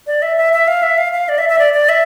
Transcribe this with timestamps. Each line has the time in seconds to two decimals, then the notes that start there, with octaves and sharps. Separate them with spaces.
0.07 D5
0.22 E5
0.37 E5
0.53 E5
0.68 F5
0.83 E5
0.98 F5
1.13 F5
1.29 D5
1.38 E5
1.49 E5
1.59 D5
1.74 D5
1.89 E5